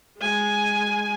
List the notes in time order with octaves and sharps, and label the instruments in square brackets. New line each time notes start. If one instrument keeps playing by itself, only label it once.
[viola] G#3 G#5